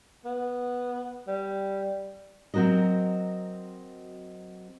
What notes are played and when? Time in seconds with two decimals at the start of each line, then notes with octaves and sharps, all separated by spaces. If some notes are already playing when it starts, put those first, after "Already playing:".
0.25 B3
1.28 G3
2.54 F#3 C4 F#4 A#4 D#5